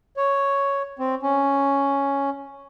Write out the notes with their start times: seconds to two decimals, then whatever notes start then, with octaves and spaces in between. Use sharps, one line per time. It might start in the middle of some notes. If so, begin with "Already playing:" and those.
0.17 C#5
0.99 C4
1.23 C#4